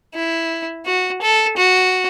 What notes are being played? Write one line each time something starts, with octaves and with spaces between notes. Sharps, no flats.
E4
F#4
A4
F#4